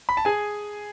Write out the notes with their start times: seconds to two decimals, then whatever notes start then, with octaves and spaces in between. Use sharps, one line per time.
0.09 B5
0.17 A5
0.25 G#4 G#5